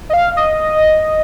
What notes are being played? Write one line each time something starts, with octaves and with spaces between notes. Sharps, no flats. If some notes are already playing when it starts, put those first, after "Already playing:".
D#5
F5
D#5